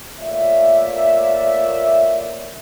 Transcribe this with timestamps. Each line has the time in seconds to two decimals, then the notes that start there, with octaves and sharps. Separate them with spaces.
0.20 A3 A#3 F4 C#5 D5 E5